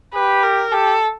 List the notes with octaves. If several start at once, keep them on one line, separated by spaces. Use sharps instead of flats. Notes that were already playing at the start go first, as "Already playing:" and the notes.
G4 B4
A#4
G4 A4